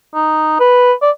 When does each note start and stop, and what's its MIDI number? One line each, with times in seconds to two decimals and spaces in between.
0.14 0.57 63
0.60 0.93 71
1.02 1.11 74